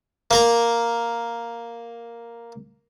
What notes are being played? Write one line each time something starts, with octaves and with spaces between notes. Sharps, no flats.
A#3 A#4 A#5